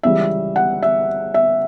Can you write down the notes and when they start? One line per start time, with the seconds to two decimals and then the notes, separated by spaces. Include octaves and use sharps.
0.03 C#2 C#3 E3 G3 E5
0.56 F#5
0.82 E5
1.34 E5